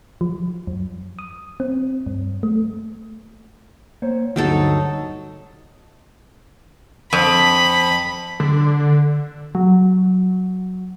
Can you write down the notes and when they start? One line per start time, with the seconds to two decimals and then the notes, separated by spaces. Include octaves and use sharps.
0.21 F3
0.67 F#2
1.19 D#6
1.60 C4
2.06 G2
2.43 A3
4.02 A#3 C5 C#5
4.36 D2 G2 F#3 D#4 A4
7.13 F2 B5
8.40 D3
9.55 F#3